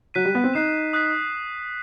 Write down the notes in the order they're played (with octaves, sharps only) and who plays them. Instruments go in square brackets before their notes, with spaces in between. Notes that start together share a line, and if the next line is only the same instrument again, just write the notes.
[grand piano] F#3 [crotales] F#6 B6 D#7
[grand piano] G3
B3
C4
[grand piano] D#4 [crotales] F#6 C7 E7
[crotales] D#6 F#6 B6